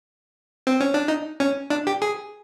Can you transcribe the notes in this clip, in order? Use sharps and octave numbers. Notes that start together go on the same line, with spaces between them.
C4
C#4
D4
D#4
C#4
D4
G4
G#4